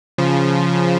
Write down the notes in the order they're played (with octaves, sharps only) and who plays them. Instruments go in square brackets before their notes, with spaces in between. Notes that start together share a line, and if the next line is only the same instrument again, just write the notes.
[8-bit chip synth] C#3 F3